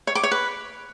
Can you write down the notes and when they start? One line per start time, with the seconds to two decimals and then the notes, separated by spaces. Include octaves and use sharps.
0.07 C#5
0.15 D6
0.23 C#5
0.32 B4